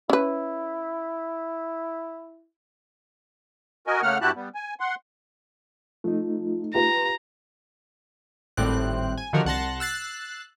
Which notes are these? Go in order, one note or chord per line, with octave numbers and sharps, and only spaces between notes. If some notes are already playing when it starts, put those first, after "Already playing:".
C#4 E4 B4
F#4 A#4 D#5 G#5
C#3 A3 A#3 F#5 F6
G2 E4 F#4 G4 A5 F#6
G3 B3
G#5
F#5 C6
F3 A3 D#4
F4 G4 B4 A#5
G#1 A2 G3 C4 F#6
G#5
D3 D#3 F3 F#4 G4 A#4
C2 F#5 A5 C6 A#6
E6 F#6 A6 C7